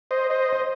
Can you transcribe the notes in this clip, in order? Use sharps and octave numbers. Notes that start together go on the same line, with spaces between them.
C5 D#5
C5 D#5
C5